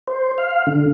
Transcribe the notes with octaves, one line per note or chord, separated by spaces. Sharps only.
C5
F5
D3